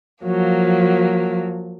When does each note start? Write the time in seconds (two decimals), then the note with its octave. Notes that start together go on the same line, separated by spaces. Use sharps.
0.24 F3 F#3 A#3